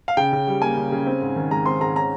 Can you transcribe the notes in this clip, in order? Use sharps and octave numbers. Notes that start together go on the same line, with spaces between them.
F5
C#3 G5
C#3
G3
A#3 G#5
C#3
C#3
C4
G#2
D#3
G#3 A#5
C4 C6
G#2 A#5
C#4 A#5